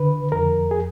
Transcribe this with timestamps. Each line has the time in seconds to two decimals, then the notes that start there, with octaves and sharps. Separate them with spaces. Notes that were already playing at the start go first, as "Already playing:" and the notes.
Already playing: D3 B4
0.32 F2 A#4
0.71 G#4